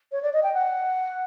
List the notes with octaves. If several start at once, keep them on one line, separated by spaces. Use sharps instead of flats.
C#5
D5
D#5
G5
F#5